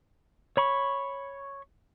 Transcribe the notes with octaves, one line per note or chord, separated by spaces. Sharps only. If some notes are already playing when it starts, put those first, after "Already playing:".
C#5 B5 C#6